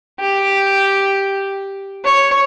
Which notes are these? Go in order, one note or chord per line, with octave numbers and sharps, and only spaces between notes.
G4
C#5